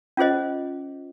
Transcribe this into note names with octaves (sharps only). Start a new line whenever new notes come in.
C#4 F4 G#4 C5 D#5